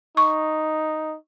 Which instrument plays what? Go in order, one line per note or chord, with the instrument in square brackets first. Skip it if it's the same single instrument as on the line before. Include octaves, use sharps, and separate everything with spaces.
[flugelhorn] D#4 [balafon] C#6